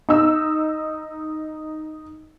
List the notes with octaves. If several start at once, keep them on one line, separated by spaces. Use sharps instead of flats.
D#4 E6